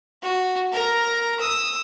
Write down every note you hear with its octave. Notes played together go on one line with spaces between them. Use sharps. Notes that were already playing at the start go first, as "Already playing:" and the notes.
F#4
A#4 A#5
D#6 E6